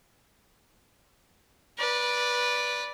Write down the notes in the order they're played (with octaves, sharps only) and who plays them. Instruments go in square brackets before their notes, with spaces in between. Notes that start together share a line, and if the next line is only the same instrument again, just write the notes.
[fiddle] B4 D5